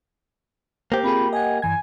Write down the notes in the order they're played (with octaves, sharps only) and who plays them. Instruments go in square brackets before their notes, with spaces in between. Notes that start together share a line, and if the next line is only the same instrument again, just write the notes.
[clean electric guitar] A#3 G4 [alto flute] C5
[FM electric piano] C4 F4 G#4 [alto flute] B5
[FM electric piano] D#5 F#5 [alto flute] G#5
[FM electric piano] G2 E3 G#6 [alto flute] G#5